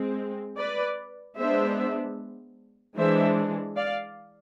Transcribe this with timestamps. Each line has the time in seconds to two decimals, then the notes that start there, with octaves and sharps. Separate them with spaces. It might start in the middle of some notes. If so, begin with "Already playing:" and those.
Already playing: G#3 C4
0.58 B4 D5
1.37 G#3 B3 D4 C5 E5
2.97 E3 G#3 D4 C5 E5
3.77 D5 F5